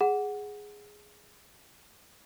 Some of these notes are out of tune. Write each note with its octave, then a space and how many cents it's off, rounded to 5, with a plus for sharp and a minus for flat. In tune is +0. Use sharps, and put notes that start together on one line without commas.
G#4 +0 F#5 +0